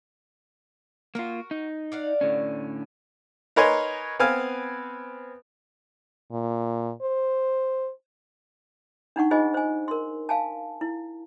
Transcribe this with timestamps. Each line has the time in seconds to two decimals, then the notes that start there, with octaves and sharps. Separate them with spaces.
1.15 A#3 F4 F#4 A#4
1.51 D#4
1.92 D5 F5 F#5
2.21 A2 D3 C#4
3.56 D#4 A#4 B4 C#5 G#5 C6
4.19 B3 C4 B4 F5 G#5
6.32 A#2
7.02 C5
9.16 D4 D#4 F#5 C#6
9.31 D#4 F4 G#4 C5 D#5 G#5
9.54 C5 G#5
9.88 A#4 C6
10.29 F5 G#5 A5
10.81 E4